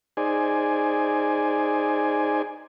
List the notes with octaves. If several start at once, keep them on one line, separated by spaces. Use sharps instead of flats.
D#4 G#4 C5 D5 G#5